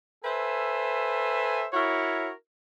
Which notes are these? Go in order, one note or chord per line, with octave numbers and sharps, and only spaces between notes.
A4 B4 C5 E5 G#5
E4 F#4 A#4 C#5